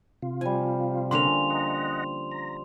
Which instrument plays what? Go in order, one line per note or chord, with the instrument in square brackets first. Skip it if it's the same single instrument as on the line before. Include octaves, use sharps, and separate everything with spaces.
[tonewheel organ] C3 F4
[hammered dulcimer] F3 G3 [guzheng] G#5
[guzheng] D3 A#3 C#4 [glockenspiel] C6 F7
[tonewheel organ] D#5 F#5 A#5
A#5